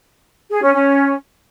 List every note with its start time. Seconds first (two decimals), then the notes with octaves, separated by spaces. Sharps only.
0.50 G#4
0.62 C#4
0.73 C#4